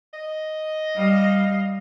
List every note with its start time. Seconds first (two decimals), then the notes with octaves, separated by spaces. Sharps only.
0.13 D#5
0.96 G3 F5